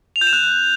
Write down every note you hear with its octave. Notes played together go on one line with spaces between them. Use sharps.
F7
G6
E7
F#6